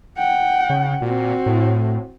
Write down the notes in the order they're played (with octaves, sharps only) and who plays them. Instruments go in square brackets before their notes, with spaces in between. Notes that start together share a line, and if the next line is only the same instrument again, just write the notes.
[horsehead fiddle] F#5 G5
[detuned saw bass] C#3
[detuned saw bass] A#2 [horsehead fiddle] C4 F#4
[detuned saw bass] A2